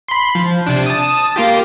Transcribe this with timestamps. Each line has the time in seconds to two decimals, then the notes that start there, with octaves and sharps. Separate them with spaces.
0.08 B5 C6
0.35 F3
0.66 C3 D4
0.86 A5 D#6
1.36 A#3 F4 G4